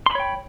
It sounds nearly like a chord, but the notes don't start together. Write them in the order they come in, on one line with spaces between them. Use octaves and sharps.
C6 B5 C#5 G5